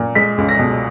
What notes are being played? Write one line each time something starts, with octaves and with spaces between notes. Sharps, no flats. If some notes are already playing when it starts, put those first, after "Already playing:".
Already playing: A#2
G#3 B6
C#2
A#6
B2